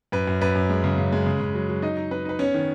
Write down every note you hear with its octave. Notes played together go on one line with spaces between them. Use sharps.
F#2 B4
F#2
F#2 B4
F#2
G#3
C#3
C#3
G#3
C#3
C#3
F#3
F#3
D#4 D#5
D#4
D#4 B4
D#4 B4
B3 C#4 C#5
D#3